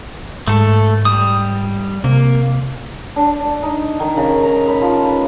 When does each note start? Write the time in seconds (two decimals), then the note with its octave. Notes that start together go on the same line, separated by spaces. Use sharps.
0.48 G#2 A3 A4
1.05 G3 D#6
2.04 C3 A#3
3.16 D4
3.40 D4
3.63 D#4
4.00 D#3
4.17 C#3
4.43 A#5
4.68 B5
4.82 F3
5.05 B4